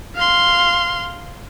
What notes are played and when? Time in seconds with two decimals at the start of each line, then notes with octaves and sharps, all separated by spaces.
0.16 F5 C6